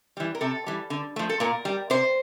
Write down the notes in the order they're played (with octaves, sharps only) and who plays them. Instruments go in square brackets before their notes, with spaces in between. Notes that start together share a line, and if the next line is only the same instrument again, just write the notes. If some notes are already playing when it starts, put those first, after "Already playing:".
[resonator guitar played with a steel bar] E3 G3
A#4
C3 A4
E3 G3
D3
F3 A3
A4
A#2 A#4
G3
C3 C5